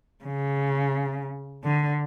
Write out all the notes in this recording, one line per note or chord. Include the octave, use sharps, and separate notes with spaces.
C#3
D3